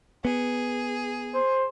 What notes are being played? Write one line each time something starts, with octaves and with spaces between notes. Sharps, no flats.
B3 G#4
C5